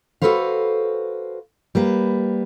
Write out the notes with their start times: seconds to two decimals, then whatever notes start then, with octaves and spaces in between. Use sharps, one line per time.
0.22 F#4 G4 A4 B4 C5 F5
1.75 G3 A#3 B4